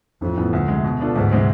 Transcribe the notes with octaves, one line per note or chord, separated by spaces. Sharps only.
A1 F2
A2 E3 B3
D2
C3 G#3
B2
B3 D4 F4 A4
D2 G#2
C3 G#3 C4